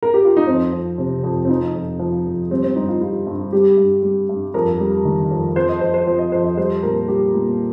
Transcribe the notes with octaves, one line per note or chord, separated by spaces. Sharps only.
A#4
G4
F4
D#4
F2 C4
F3
C3
F2
C4
F3 D#4
F2
F3
F2
G3 C4
C4
G2 D#4
F4
G3 F4
G2
G3 G4
G2
G3
G2
F2 A#4
G3
D#3
F2
F3 C5
D#5
F2 C5
C5
F3 C5
D#5
F2 C5
D#5
G3 C5
A#2 A#4
G3 G4
A#2